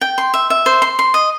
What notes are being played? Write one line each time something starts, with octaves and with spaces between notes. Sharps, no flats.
G5
C6
E5
E5
C5
C6
C6
D#5